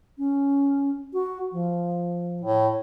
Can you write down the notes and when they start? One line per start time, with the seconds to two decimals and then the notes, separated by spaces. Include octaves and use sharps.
0.18 C#4
1.13 F#4
1.52 F3
2.41 A2